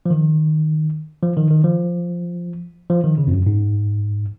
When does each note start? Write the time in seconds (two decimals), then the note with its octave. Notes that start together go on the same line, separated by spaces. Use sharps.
0.06 F3
0.10 D#3
1.22 F3
1.37 D#3
1.51 D#3
1.64 F3
2.90 F3
3.04 D#3
3.18 C#3
3.27 F2
3.31 F#2
3.46 G#2